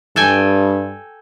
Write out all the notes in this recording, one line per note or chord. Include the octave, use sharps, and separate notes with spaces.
G2 A4 G5 G#5